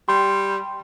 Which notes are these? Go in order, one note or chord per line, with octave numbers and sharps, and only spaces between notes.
G3 C6